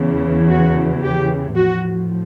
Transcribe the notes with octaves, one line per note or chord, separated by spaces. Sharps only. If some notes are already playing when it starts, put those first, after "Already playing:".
Already playing: E2 C#3 E3
F#4
G4
A2 F3 F#4